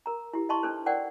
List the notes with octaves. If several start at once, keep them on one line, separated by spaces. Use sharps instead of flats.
A#4 A#5
E4 G4
D#5 E5 A5 C6 C#6
D4 D#4 A4 B4 C5
A#4 C5 D5 F#5 G5